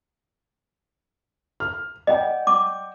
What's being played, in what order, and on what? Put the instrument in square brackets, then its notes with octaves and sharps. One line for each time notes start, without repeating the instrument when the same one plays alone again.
[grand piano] F6
[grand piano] D5 F#5 G5 [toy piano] D#5
[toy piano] D6